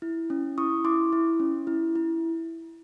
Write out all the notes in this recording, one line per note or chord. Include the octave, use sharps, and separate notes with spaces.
E4
C#4
E4 C#6 D#6
E4 C6 D6
E4
C#4
E4
E4